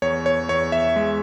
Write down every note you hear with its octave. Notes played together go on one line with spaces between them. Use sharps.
E2 C#5
C#5
E2 C#5
E5
G#3